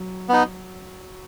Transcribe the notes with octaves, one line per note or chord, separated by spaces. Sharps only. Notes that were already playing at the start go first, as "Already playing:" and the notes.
Already playing: F#3
B3 D#4